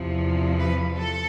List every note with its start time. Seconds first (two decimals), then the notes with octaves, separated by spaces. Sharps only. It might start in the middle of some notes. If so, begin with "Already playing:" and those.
Already playing: E2 C3 F3
0.59 B4
0.98 A4